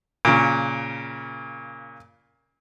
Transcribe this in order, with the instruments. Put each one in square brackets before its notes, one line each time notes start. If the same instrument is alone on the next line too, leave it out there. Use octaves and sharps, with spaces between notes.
[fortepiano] A#2 C#3